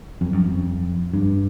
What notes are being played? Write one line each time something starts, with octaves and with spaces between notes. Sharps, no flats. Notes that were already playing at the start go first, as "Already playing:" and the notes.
F2
F#2
F2
G2